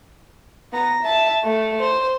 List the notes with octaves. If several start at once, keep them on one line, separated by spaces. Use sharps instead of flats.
B3 A#5
E5 A5
A3
C5